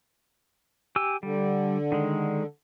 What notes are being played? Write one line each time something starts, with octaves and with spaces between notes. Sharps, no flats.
G4 G#5 E6
D3 G3
D#3 G#3